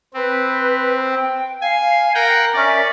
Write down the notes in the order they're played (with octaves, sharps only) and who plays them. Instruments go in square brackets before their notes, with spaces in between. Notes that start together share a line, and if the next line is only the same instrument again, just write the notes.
[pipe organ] C4 [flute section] B4
[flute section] G5
[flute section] F5 [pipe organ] G#5
[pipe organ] A#4 F#5 G5
[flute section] C#4 A#4 E5 [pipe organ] D5